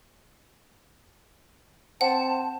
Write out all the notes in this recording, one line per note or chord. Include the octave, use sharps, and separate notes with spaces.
C4 F#5 A5